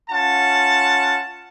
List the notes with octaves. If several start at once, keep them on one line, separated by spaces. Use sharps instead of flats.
C#4 F4 F#5 A5